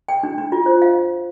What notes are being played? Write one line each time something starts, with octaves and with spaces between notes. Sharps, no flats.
G5
D4
D4
F4
C5
F5